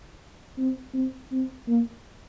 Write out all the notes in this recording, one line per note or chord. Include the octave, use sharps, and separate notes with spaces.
C4
C4
C4
A#3